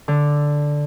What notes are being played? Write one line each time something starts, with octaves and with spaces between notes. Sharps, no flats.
D3